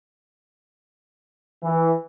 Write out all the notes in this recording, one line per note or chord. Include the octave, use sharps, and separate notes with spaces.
E3